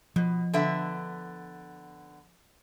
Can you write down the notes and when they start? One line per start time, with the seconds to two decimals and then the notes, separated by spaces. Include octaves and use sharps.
0.16 B2 F3
0.54 D3 B3 E5